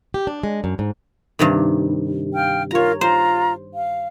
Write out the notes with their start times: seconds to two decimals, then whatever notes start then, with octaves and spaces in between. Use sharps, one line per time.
0.14 G4
0.27 D4
0.43 G#3
0.64 F#2
0.79 G#2
1.39 G2 C3 D#3
2.34 F5 G5 F6
2.71 F4 A#4 C#5 A#5
3.01 F4 C5 A#5
3.74 F5